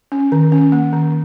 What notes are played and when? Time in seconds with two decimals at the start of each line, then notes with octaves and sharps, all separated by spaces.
0.12 C#4
0.32 D#3
0.52 C#4
0.72 A#3
0.93 D#3